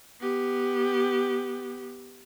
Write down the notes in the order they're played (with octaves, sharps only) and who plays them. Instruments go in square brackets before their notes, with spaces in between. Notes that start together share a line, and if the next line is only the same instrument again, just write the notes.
[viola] B3 G4